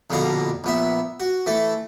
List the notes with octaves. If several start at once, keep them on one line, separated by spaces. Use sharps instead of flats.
A#1 F2 B2 D3 F5 A#5
A#1 B3 E5
F#4
E3 A3 A4